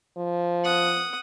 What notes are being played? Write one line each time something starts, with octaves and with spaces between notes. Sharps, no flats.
F3
F#5 D#6